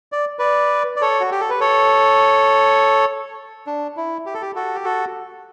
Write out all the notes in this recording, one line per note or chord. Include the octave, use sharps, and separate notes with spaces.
D5
B4 D5
D5
A4 C#5
F#4
G4
A4
B4
A4 C#5
D4
E4
G4
A4
G4
F#4 A4
G4
F#4 A4